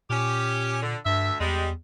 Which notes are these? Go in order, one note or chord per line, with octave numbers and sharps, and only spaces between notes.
A#2 C#4 G4
D3
D2 G2 E5
E2 G3 G#3